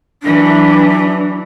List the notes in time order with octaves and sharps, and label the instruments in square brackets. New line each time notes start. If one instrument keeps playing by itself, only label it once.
[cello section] E3 F#3 [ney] D4